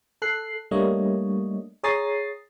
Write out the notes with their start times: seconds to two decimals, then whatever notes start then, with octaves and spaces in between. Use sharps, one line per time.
0.22 A4 F#6 C7
0.71 G3 A3 A#3 D4 C#5 D#5
1.83 G#4 C#5 A#5 D#6 A6 C7